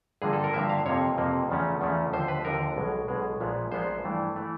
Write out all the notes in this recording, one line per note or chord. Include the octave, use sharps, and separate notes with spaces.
G2 D3 F3 A#3 G#4
A4
A#4
G2 D3 F3 A#3 E5
F5
F2 C3 F3 A#3 C#5
F2 C3 F3 A#3
E2 C#3 F3 A3 C#4
E2 C#3 F3 A3 C#4
D#2 D3 F3 C5
B4
D#2 D3 F3 A#4
B1 B2 G#3
B1 B2 G#3
A#1 A#2 F3 G#3 B3
A#1 A#2 F3 G#3 B3 C5
G2 E3 A3
E3 A3